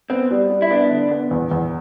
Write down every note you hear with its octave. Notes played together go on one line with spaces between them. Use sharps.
B3 C4
G3
G3
E4
B3 D4
D3
B3
E2
E2